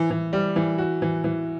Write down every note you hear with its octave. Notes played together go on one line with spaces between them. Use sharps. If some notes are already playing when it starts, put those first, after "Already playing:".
Already playing: E3
E3
G3
E3
F#4
E3
E3